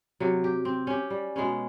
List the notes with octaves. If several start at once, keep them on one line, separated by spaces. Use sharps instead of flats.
C3 F#3
G4
C4
C#4 G4
G3
B2 G#3 B3 C#4